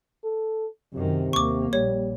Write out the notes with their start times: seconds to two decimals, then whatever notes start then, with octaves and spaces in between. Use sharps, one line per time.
0.24 A4
0.94 F#2 C3 D#3
1.33 D#2 A#3 C#6 D6
1.73 A#1 G3 C#5